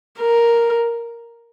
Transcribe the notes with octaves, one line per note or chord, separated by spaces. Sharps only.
A#4